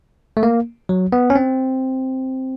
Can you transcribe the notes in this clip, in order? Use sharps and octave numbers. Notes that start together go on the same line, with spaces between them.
A3
A#3
F#3
B3
C#4
C4